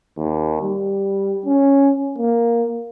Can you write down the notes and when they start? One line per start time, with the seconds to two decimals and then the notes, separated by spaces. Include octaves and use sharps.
0.17 D#2
0.62 G3
1.46 C#4
2.18 A#3